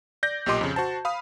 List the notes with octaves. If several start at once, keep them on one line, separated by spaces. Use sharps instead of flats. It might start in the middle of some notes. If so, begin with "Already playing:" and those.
D5 G6 A#6
B1 A#2 G4 D#5 C6 D6
F2 C#3
F#4 C5 A5
F5 B5 D#6